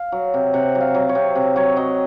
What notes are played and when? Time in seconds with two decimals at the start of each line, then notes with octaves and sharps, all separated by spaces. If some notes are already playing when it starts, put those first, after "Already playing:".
Already playing: F5
0.12 F#3
0.34 C3
0.54 C3 F#5
0.75 F#3
0.81 F5
0.95 F#3
1.09 C#5
1.15 C3
1.35 C3
1.56 F#3 C#5
1.76 F#3 D#5